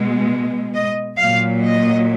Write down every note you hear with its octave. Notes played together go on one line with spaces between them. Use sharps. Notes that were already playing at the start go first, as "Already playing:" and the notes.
Already playing: B2 G#3
D#5
A#2 F#3 F5
D#5